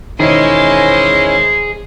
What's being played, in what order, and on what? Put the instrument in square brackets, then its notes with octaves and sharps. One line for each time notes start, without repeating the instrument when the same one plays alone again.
[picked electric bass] E1 D#3 [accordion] C#4 E4 [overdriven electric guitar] G#4 D#5 [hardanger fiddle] C5